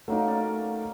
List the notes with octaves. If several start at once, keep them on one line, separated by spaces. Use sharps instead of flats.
F#3 A3 A#3 D#4
C#4 D5